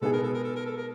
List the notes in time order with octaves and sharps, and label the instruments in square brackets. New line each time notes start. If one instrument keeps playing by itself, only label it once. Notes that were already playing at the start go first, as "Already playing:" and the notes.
[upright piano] B2 G#3 B3 D#4 G#4 [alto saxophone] A4
[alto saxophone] A#4
A4
A#4
A4
A#4
A4
A#4